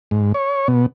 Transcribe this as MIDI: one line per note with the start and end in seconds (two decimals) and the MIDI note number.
0.11 0.32 44
0.34 0.68 73
0.68 0.86 47